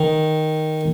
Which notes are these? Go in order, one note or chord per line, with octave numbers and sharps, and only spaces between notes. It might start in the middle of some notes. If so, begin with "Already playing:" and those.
Already playing: D#3